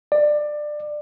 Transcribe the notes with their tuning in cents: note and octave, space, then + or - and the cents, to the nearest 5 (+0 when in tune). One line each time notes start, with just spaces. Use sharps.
D5 +20